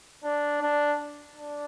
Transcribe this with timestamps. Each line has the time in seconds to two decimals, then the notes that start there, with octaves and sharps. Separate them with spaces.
0.24 D4
0.61 D4
1.36 D4